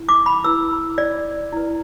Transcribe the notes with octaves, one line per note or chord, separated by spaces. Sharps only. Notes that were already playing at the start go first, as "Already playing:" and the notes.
Already playing: E4
D6
B5
E4 B4 E6
D5
E4 B4